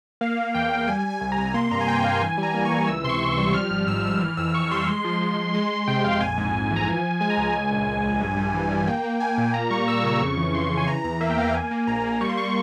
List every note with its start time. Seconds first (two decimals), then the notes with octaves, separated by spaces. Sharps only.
0.21 A#3 F5
0.37 A#3
0.55 E2 G5
0.71 E2
0.87 G3 G#5
1.04 G3
1.10 G#5
1.21 C2
1.32 A#5
1.38 C3
1.54 A#3 C6
1.71 G2 A#5
1.81 G#5
1.88 A#3 G5
2.04 G2 F5
2.21 E3 G#5
2.38 G3
2.43 A#5
2.54 A#3
2.65 C#6
2.71 E3
2.87 C#2 E6
3.04 C3 C6
3.09 C#6
3.21 C3
3.32 G3 E6
3.54 F3 F6
3.71 G#1
3.87 G#2 E6
3.97 F6
4.05 G#1 E6
4.21 E3 F6
4.37 F2 E6
4.49 E6
4.54 F2 C#6
4.71 G3 C6
4.88 G#3
5.05 F3
5.21 G#3
5.38 F3
5.54 G#3 C6
5.71 G#3
5.88 C3 G5
6.04 F2 F5
6.21 A#1 G#5
6.38 G#2
6.54 A#1
6.71 E3
6.76 A#5
6.87 F3 G#5
7.04 F3
7.21 G#3 G#5
7.30 A#5
7.37 C#2 G#5
7.55 G#3
7.71 A#1
7.88 A#1
8.04 A#1
8.20 G2
8.37 G3
8.54 E3
8.71 G3
8.87 A#3 G5
9.04 A#3
9.20 A#3 G#5
9.38 A#2
9.54 A#3 A#5
9.70 G3 C#6
9.88 G3 E6
10.04 C#3 C#6
10.21 F2 C#6
10.37 E3
10.54 F2 C6
10.71 C#3
10.77 G#5
10.87 E3 A#5
11.04 E2 A#5
11.21 A#3 E5
11.30 G5
11.37 E2 F5
11.47 A#5
11.53 A#3 G#5
11.71 A#3
11.87 A#1 A#5
12.04 A#3
12.21 G3 C#6
12.29 C6
12.37 C#6